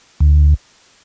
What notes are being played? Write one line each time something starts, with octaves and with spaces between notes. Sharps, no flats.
D2